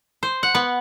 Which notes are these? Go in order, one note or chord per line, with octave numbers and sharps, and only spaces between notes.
C5
F#5
B3